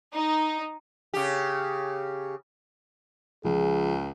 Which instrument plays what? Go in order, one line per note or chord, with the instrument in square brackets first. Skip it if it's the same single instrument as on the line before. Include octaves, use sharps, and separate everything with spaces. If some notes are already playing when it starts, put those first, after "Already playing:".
[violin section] D#4
[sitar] C#3 G4
[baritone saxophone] C#2 [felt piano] F3 [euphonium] G#4